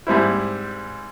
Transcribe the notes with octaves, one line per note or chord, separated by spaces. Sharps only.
G#2 G3 C4 E4